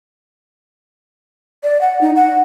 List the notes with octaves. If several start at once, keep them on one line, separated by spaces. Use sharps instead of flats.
D5
F#5
D#4
F#5